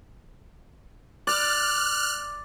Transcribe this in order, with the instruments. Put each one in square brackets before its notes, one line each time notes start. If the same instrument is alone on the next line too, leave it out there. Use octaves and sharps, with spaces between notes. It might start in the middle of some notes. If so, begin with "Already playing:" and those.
[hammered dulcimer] D5 [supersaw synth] F6 F#6